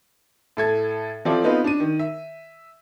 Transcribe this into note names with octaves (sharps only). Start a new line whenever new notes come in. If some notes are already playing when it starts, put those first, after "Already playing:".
A2 A4 G#6
F3 C4 E4 F4 A4 D5
B3 C4 D#4 F4 B4 C5
D4 D#7
D#3
E5